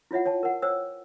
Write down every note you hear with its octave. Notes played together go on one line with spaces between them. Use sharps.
E4 F4 C#5 E5 F#5
C#5 G5 A5
A#4 F#5
C5 C#5 G5 E6